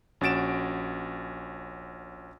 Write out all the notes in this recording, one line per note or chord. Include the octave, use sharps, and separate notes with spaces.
A#1 C#4 F#4 A6 D7 E7